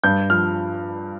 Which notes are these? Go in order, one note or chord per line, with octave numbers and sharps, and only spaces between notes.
G2 G6
F3 F6